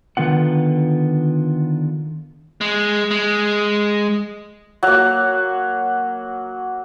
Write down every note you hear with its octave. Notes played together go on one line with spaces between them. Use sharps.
D3 D#3 B3 F4 F#5
G#3
G#3
F#3 A#3